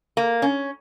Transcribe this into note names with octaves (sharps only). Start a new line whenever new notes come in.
A#3
C#4